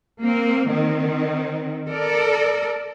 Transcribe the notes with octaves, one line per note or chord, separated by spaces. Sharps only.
A#3 C4
D#3 C4
A4 A#4 D5